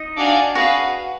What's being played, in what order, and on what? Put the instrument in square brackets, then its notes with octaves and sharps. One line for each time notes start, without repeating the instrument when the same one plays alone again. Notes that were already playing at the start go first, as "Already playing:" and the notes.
Already playing: [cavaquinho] D#4 D#5
[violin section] D4 F#4 D5 F5 G#5
[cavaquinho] F#4 F#5 [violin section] G#4 B4 F5